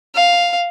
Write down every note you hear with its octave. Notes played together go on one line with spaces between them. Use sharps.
F5